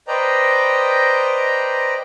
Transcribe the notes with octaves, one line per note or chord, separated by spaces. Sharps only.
B4 C5 D5 D#5 G5 A#5